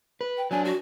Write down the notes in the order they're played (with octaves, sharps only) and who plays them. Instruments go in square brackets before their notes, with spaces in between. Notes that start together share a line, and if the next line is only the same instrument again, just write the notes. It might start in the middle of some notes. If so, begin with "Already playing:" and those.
[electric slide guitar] B4
[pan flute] G5
[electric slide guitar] F#3 D4 [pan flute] G#5
[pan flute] F#4